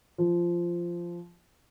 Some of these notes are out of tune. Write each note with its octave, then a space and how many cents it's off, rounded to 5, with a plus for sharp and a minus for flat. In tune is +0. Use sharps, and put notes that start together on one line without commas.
F3 -10